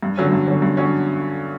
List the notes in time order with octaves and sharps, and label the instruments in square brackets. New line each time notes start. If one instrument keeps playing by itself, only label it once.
[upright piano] G2
D3 F#3 C#4
G2
D3 F#3 C#4
G2
D3 F#3 C#4